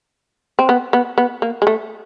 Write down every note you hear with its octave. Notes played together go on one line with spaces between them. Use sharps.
C4
B3
B3
B3
A#3
G#3
A3